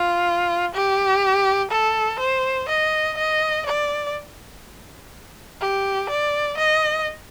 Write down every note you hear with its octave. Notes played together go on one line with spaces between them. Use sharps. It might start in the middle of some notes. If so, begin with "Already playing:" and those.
Already playing: F4
G4
A4
C5
D#5
D#5
D5
G4
D5
D#5